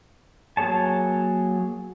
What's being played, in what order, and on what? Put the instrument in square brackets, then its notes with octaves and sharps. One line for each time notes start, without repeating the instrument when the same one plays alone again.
[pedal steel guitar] F#3 A#3 G#4 C#5 A5